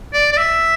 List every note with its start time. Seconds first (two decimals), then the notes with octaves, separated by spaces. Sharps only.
0.13 D5
0.32 D5
0.37 E5